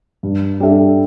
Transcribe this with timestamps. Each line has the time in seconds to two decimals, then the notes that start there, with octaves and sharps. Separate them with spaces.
0.23 G2
0.60 G3 D4 A4 E5